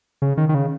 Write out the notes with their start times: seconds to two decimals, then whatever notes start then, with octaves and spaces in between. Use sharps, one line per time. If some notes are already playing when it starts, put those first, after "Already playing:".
0.22 C#3
0.37 D#3
0.49 D#3
0.55 C#3